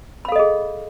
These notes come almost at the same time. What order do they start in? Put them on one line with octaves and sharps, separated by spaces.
B5 F5 A4 D#5 G#4